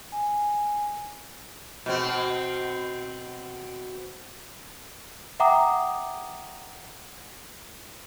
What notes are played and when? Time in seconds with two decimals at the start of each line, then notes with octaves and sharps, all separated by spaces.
0.12 G#5
1.86 B2 C4
5.40 E5 F#5 G5 A#5 D6 D#6